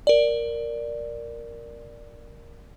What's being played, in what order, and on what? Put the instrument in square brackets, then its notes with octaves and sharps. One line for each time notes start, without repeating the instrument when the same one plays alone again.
[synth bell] A#4 D5